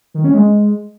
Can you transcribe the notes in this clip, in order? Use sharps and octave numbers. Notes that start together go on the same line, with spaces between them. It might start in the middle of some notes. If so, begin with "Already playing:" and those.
D#3
C#4
G#3